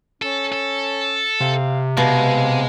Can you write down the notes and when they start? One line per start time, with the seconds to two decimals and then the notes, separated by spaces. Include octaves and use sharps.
0.22 C#4 A4
0.52 A4
1.41 C3 F5
1.97 B2 G#3 F5